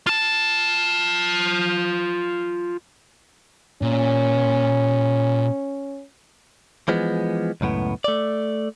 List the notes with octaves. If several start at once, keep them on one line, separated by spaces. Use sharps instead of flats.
F4 A5
A#2 C#4
E3 F3 G#3 B3
C#2 F#2 A2 B3
A3 D5